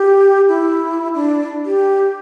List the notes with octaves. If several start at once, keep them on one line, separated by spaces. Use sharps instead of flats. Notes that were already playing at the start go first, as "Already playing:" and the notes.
Already playing: G4
E4
D4
G4